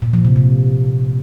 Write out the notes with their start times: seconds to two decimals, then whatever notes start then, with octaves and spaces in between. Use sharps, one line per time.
0.02 A#2
0.13 F3
0.25 C3
0.36 C3